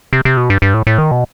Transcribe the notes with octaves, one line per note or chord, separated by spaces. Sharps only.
C3
C3
B2
G2
G2
A2
A2
D#3
B2